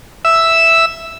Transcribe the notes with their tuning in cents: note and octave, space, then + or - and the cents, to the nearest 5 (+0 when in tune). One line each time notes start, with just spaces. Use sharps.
E5 +0 E6 +0